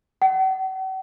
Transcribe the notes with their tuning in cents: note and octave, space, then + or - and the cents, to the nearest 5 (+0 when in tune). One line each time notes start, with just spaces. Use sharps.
F#5 +45